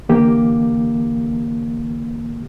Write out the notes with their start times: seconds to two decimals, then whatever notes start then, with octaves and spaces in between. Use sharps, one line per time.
0.09 D3 E3 A#3 G4